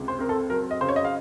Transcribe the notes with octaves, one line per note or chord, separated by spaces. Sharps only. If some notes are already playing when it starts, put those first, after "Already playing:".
Already playing: C#2 C3
C5
C4 A#4
A4
F#3 A#4
D#5
C#3 C5
C#5
D#5
F5